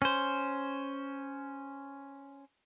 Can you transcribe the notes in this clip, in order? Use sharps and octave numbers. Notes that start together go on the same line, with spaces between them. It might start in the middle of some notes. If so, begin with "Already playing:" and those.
C#4 C5